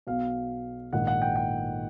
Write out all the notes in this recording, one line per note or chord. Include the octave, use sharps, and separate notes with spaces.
B1 B2 F5
A#1 G#2 D#3 F#5
F#5
G5
G5